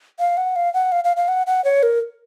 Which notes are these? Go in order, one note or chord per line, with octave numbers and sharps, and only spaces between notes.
F5
F#5
F5
F#5
F5
F5
F5
F#5
F#5
C#5
A#4